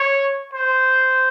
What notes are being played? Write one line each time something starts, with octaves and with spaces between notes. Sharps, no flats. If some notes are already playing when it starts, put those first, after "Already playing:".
Already playing: C#5
C5